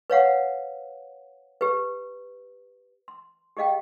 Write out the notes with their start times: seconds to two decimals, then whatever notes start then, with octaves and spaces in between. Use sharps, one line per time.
0.10 B4 C#5 F5 F#5
1.61 G4 B4
3.08 C6
3.57 G4 G#4 D#5 F5 G5